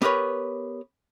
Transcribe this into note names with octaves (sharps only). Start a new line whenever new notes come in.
B3 G4 A#4 B4 C#5